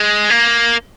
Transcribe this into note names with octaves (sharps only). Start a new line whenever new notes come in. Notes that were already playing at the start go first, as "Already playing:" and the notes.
Already playing: G#3
A#3